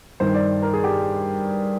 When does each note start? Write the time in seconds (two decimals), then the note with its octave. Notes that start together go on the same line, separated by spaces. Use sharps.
0.20 G2 D#3 C5
0.35 D5
0.62 A#4
0.73 G#4
0.84 G4